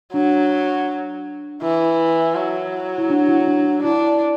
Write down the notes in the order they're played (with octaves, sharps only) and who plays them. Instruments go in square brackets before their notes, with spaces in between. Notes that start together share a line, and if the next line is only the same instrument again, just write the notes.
[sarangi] F#3 [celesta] D4
[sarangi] E3 [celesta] E4
[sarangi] F#3
[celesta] E4
D4
E4
D4
[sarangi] D4 [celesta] E4